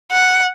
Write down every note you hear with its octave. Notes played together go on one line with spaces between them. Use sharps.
F#5